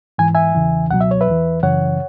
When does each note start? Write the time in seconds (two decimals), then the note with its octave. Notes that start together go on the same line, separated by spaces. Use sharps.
0.18 G#2 E3 G#5
0.35 E5 G#5
0.55 E2 C#3 E3
0.91 C#2 B2 F#3 F#5
1.01 E5
1.11 C#5
1.21 B4 E5
1.27 E2 E3
1.63 F#2 C#3 E3 C#5 F#5